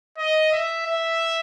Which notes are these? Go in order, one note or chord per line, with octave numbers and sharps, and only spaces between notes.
D#5
E5
E5